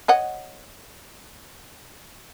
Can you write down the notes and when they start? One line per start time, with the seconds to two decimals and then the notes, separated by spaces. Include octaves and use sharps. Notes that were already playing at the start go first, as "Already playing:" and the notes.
0.08 C#5 D#5 F#5